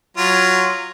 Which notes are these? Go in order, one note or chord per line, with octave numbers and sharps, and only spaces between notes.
F#3 F4